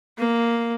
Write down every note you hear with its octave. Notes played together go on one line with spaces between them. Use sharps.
A#3